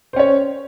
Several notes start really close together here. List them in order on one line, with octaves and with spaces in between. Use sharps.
C5 C#4 C#5